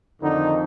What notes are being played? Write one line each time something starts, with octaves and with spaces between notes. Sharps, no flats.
F2 D3 D#3 D#4